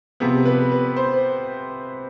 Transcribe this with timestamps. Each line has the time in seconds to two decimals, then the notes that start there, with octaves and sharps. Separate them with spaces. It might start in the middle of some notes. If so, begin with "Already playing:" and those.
0.20 C3 F3 B3
0.45 B4
0.71 B4
0.96 C5